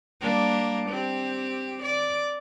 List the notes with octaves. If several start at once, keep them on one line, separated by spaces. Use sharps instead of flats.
G3 A#3 D4
C4 G4
D5